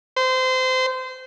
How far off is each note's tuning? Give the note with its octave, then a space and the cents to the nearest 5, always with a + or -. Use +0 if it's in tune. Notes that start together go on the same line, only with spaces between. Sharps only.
C5 -25